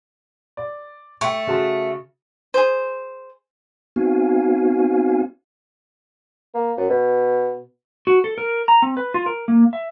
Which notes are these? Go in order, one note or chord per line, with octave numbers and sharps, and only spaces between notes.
D5
A3 G5 C#6
C#3 F#4 A5
G#4 C5
B3 C4 D#4 F#4 F5 G#5
A#3
F#2
B2
F#4
A4
A#4
A#5
C4
B4
F4
A#4
A#3
E5